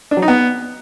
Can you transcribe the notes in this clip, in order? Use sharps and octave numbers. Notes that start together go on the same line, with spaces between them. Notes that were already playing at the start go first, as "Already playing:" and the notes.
D4
F#3
D#4
B3